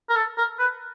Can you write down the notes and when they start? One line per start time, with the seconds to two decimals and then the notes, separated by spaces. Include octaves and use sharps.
0.09 A#4
0.16 A4
0.38 A#4
0.59 B4